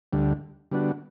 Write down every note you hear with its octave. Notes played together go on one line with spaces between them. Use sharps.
D2 D3 G3
D3 G3 B3 D4 F#4